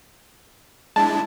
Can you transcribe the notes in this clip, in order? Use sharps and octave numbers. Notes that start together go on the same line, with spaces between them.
G#3 D4 E4 A5